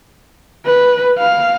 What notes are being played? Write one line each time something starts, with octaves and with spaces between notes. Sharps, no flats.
B4
F5